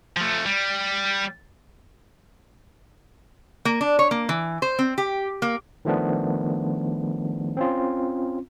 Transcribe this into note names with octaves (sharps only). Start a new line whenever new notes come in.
F3 A3
G3
A#3
D4
C#5
A#3
E3
C5
C4
G4
A#3
D#3 F3 A3 B3 D4
C4 C#4 F4